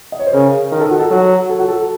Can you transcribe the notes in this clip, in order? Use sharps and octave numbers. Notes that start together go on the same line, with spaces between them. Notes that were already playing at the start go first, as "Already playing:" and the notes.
D#5
C#5
C5
C#3 A#4
D#3 A#4
A4
F#4
A4
F#3
A4
F#4
A4